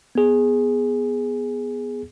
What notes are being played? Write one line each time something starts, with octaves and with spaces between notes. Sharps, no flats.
B3 G#4